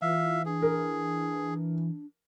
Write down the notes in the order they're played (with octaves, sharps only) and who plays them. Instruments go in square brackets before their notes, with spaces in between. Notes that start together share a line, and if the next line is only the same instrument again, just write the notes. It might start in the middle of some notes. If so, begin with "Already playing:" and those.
[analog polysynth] E3 [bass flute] F4 [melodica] E5 F5
[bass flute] D4 [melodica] G#4
[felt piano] A#4